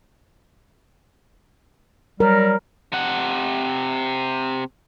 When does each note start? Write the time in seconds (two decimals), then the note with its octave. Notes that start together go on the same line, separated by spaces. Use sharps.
2.20 F#3 G3 A#4
2.92 C3 F#5